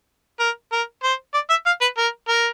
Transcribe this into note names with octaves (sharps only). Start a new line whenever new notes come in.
A#4
A#4
C5
D5
E5
F5
B4
A#4
A#4